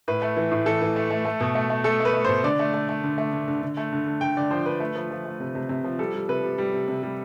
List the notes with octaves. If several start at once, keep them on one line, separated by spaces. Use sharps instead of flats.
A2 B4
A3
E3
A2
E3 A4
E3
A3
A3
A3
B2
A3
A3
A3 A4
A3
B4
A3
B2 C5
D3 D5
A3
A3
A3
D3
A3
D3
D3
D3
A3
D3
D3
D3 G5
D3 D5
F3 C5
D3 B4
A3
F3
F3
A3
C3
C3
C3
F3
G3 A4
G3
C3 B4
G3
G3
C3
C3
G3